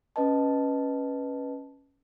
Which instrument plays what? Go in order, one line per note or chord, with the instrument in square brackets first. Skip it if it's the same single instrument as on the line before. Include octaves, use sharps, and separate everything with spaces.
[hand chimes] C#4 B4 D#5 A5